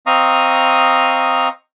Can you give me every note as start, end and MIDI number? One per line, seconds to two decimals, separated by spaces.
0.06 1.48 60
0.06 1.48 75
0.06 1.48 77
0.06 1.48 82
0.06 1.48 85
0.06 1.48 87